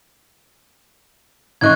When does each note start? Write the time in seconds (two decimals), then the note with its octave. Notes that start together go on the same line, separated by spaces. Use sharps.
1.61 A1 A2 D#5 C#6 F#6 G#6